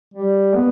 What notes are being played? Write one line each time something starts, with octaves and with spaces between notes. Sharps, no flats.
G3
B3